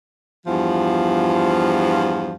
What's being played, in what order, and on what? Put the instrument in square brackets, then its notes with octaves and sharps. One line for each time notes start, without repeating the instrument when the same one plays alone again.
[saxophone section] E2 G2 F3